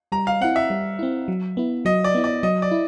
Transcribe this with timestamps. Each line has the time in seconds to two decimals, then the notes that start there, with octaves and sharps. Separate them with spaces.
0.12 G3 A#5
0.27 F5
0.41 C4 E4 F#5
0.56 E5
0.70 G3
0.99 C4 E4
1.28 F#3
1.57 B3 E4
1.85 F#3 D#5
2.04 D5
2.14 B3 E4
2.24 D5
2.43 F#3 D#5
2.62 D5
2.71 E4